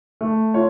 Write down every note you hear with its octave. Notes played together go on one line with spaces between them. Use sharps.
A3
F4 C#5